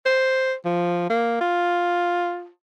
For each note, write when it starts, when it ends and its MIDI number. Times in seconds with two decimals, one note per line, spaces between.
0.06 0.54 72
0.65 1.08 53
1.10 1.37 58
1.40 2.48 65